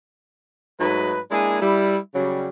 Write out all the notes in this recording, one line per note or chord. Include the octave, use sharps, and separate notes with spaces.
G#2 F#3 A3 D#4 B4
G#3 A#3 D4 E4 G#4
G3 E4
C#3 F#3 G3